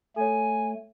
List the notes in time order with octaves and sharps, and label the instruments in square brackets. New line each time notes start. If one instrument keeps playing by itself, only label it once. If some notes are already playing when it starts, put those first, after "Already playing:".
[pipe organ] A3 [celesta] A4 C#5 [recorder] G#5